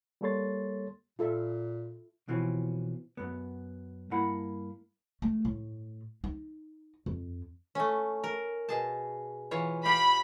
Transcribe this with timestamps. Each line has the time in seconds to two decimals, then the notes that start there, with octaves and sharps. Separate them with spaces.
0.21 G3 A#3 A4 C#5 C6 A6
1.19 A#2 F4 A4 E5
2.28 B2 E3 F3 C4 C#4
3.17 F#2 B3
4.11 G2 A#3 E4 F#5 B5
5.22 A3
5.45 A2
6.24 D#4
7.06 F2
7.75 A3 C#4
8.24 A#4
8.69 B2 G#4 A5
9.51 E3 F4 C#5
9.85 G4 F5 G5 B5